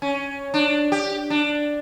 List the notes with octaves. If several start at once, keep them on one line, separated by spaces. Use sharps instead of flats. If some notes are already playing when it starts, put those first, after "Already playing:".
C#4
D4
G4
D4